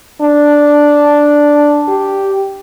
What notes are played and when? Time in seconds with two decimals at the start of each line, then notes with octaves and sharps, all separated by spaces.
0.21 D4
1.88 G4